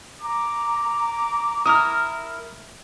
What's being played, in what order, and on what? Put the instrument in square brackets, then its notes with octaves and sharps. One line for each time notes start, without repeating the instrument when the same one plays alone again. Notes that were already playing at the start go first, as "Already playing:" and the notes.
[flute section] A#5 [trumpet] D6
[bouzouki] E4 A#4 [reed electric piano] D#6 F6